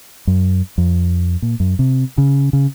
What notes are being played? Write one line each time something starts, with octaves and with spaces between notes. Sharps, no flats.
F#2
F2
A#2
F#2
C3
C#3
C#3